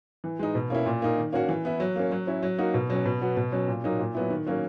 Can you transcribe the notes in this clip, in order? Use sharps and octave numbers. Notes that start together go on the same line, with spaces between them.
E3
G#3 D#4
B2
A#3 C#4 E4
A#2
A#3 D#4
D#3
A#3 C#4 F#4
E3
B3 E4
F#3
A#3 C#4
F#3
C#4 E4
F#3
A#3 D#4 F#4
B2
F#3 C#4
B2
F#3 B3 F#4
B2
F#3 C#4
A#2
F#3 A#3 D#4
A#2
F#3 B3 E4
D#3
F#3 A#3 C#4